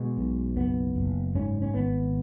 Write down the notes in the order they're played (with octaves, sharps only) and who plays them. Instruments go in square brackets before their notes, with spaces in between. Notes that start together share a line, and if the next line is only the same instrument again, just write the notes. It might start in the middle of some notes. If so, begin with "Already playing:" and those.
Already playing: [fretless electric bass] B2 G#3
B1
F#1 B3
F#1
G#2 C#4
C#4
G#1 B3